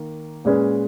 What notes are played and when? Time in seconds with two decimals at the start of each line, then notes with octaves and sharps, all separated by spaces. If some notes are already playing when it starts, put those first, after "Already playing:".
Already playing: D#3 A#3
0.45 A#2 G#3 C#4 G#4 B4